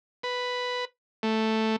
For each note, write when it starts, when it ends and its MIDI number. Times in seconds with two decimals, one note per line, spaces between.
0.23 0.85 71
1.23 1.76 57